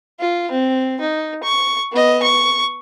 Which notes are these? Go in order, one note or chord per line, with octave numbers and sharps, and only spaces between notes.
F4
C4
D#4
C#6
B3 D#5
C#6